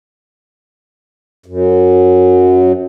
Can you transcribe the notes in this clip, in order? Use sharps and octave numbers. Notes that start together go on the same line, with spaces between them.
F#2